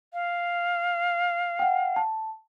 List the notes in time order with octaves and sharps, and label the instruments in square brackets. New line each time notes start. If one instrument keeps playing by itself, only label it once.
[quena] F5
[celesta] F#5 G5
A5